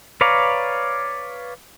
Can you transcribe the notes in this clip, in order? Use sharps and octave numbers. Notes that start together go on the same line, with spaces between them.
B4 C#5 D5 F5 A#5